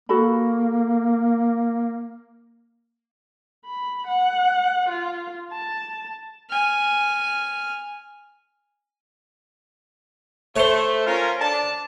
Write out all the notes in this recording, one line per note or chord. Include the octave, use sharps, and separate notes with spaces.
A#3 F#4 A4 B5
B5
F#5
F4
A5
G#5 F6
A3 C5 C#5
C#4 F4 A#4
D4 A5